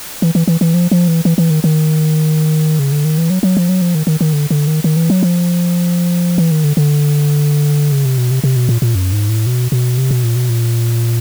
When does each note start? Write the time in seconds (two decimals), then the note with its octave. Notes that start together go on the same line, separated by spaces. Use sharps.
0.22 E3
0.35 E3
0.48 E3
0.61 E3
0.74 F3
0.91 F3
1.08 E3
1.25 E3
1.38 E3
1.50 D#3
1.64 D#3
2.79 C#3
2.92 D3
3.05 D#3
3.18 E3
3.30 F#3
3.43 F#3
3.57 F3
3.69 F#3
3.82 F3
3.95 D#3
4.07 D#3
4.21 D#3
4.33 D3
4.51 D3
4.67 D#3
4.84 D#3
4.97 E3
5.10 F#3
5.23 F3
6.38 E3
6.51 D#3
6.64 D3
6.77 D3
7.92 C#3
8.05 C3
8.18 B2
8.31 C3
8.44 C3
8.56 B2
8.69 A#2
8.82 A#2
8.95 F#2
9.12 G#2
9.29 A2
9.47 B2
9.72 B2
9.98 C3
10.11 B2
10.24 A#2
10.36 B2
10.49 A#2